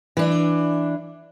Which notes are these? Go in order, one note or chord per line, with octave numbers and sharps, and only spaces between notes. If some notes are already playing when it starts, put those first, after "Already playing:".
E3 D4